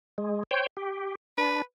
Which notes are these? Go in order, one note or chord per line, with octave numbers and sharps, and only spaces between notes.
G#3
C5 C#5 G5
G4
D4 B4